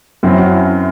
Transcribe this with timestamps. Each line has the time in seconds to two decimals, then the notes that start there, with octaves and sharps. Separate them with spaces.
0.23 F#2 F#3 C4 E4
0.37 F#4
0.51 E4
0.65 E4